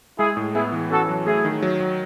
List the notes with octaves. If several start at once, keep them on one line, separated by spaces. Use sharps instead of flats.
G#3 E4 G#4
A2
B3 E4 G#4
E3
C#4 F#4 A4
F#3
A3 E4 G#4
D#3
F#3
F#3